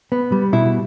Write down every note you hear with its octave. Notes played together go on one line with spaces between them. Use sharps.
B3
G3
B2 E4